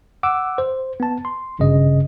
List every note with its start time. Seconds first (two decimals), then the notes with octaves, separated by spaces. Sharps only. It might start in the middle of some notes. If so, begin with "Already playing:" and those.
0.23 F#5 D6 E6
0.58 C5
1.00 B3 A5
1.25 C6
1.59 G#1 G2 C#3 D#5